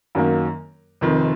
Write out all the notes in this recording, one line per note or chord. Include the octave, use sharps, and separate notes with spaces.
F#2 D#3 F#3 A#3
F1 F2 D#3